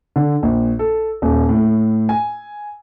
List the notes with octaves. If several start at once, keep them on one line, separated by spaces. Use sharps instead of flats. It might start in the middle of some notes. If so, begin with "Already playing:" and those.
D3
A#1
A4
D#1
A2
G#5